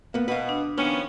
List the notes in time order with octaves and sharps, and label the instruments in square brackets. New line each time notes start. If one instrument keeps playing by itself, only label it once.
[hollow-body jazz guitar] A#3 B3
[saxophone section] B2 [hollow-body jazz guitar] B4 F5 [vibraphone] F#5
[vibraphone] D4
[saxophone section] D#3 F3 C#4 [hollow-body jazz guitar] B3